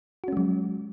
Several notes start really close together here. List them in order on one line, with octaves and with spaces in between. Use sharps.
F#4 C#4 G#3 F#3